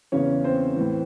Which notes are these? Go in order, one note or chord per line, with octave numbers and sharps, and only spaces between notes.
E2 C#3 E3 C#4 C#5
C4 C5
A2 E3